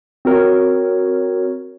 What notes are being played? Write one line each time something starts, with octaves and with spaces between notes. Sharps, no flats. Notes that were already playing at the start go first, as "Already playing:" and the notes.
C4 F#4 A#4 C#5